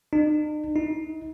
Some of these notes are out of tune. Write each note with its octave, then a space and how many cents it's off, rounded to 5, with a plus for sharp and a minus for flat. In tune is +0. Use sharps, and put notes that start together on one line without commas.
D#4 -45
D#4 +35